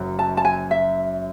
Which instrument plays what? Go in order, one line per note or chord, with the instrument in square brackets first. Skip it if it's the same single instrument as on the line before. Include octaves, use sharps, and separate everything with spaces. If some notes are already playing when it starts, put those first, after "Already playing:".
Already playing: [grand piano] F#1 F#2 C#3 F#3
[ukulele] A5
A5
G#5
E5